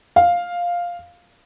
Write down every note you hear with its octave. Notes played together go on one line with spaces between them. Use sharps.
F5